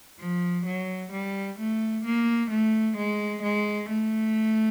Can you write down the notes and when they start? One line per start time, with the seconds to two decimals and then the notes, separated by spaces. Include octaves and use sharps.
0.19 F3
0.65 F#3
1.11 G3
1.59 A3
2.05 A#3
2.51 A3
2.97 G#3
3.42 G#3
3.89 A3